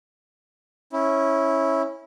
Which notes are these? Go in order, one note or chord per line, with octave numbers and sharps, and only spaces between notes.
C#4 E4